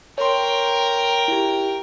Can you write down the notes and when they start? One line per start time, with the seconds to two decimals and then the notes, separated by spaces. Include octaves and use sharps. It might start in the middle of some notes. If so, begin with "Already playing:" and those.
0.18 A#4 C#5 G5 C6
1.28 E4 G4